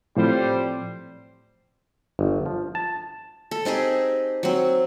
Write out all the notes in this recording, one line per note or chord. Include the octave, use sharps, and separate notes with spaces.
A2 F3 G3 C4 C5
G1
F3
A5
A4
C4 D#4 G4 G#4
F#3 C4